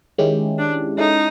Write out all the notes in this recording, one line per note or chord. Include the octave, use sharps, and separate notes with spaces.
D#3 G#3 C#4 E4 G4
D4
G#3 C#4 D#4 E4 A4